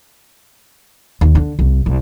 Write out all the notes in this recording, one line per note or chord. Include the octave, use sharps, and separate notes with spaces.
D#2
D3
C2
C2